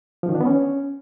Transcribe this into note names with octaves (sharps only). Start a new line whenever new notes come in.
F3
D#3
D4
B3
C#4